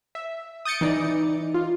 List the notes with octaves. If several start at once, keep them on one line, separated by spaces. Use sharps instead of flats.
E5
D#6 G6 A6 C#7 D7
E3 D#4 D5
F4